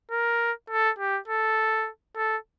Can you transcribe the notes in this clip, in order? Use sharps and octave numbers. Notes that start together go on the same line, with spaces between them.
A#4
A4
G4
A4
A4